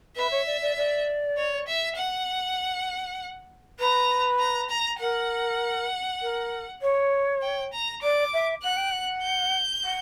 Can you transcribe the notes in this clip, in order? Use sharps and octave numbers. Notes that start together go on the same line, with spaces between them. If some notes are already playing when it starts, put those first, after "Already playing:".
B4 E5
C#5
D5
D5
D5
C#5
E5
F#5
B4 A#5
A#5
A#5
A#4 F#5
A#4
C#5
G5
A#5
D5 D6
E5
F#5 F#6
G5
F#5
G6
F#5